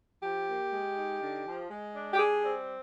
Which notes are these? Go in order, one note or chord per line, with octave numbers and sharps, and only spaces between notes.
F3 G4
A#3
G#3
D#4
D3
F3
G#3
D4
G4
G3 G#4
C4